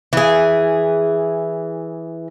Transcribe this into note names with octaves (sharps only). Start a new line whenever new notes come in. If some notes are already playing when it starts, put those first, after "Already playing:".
E3 G#4